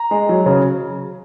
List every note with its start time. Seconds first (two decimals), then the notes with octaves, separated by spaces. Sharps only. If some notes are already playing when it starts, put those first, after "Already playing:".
Already playing: A#5
0.11 G#3
0.29 F#3
0.46 C#3